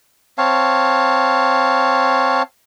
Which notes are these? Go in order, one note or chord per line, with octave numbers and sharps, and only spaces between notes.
C4 C#5 F5 A5